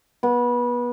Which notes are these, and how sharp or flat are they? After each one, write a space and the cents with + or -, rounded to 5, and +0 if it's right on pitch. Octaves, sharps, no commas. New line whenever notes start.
B3 -25